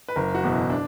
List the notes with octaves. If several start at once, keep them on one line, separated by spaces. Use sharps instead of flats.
B4
F#1 A#4
F#4
E2 B2
E4
D4